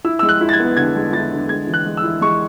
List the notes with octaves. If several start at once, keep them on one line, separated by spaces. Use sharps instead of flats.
E4 E6
G#3 E6
F#6
E4
A6
G#6
B3
D3 G#6
G#3
E4 A6
D3
G#3 G#6
E3
F#6
G#3
E6
E4
G#3 C#6